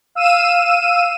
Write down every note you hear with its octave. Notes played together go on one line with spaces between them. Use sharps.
F5 E6 D#7 E7